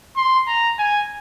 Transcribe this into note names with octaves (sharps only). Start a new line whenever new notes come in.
C6
A#5
G#5